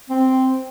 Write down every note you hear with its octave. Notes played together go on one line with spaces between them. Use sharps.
C4